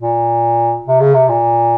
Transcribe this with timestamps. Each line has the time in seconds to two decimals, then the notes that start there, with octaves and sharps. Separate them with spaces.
0.02 A#2
0.87 C3
1.00 C#3
1.14 C3
1.29 A#2